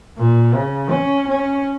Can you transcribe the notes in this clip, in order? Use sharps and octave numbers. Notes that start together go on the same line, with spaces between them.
A#2
C#3
C#4
C#4